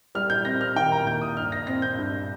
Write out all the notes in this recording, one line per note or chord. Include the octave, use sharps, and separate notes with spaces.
G3 F6
G6
C4 A#6
F6
D#3 G5
A#5
D#2 G6
D#6
G2 F6
A#6
C4 A#6
G6
G2